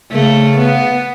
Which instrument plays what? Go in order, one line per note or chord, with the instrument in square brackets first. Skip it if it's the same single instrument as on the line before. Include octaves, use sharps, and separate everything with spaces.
[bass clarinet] C#3 [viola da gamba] A3
[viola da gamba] B3